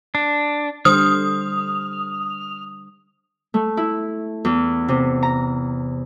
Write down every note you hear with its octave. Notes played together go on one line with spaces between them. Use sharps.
D4
D3 G3 C5 D#6 F6
A3
E4
E2
C3
A#5